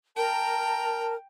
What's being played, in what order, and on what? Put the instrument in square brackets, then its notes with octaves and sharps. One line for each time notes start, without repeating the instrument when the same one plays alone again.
[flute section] A#4 [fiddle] G5 [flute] A5